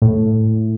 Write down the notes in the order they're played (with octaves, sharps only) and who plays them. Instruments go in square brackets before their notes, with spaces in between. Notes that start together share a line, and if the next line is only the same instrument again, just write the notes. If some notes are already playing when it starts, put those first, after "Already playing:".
[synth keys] A2